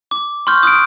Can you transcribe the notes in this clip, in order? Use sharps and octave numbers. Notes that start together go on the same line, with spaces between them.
D6
C6 C#6 F6 G6
D#6 F6 F#6 D7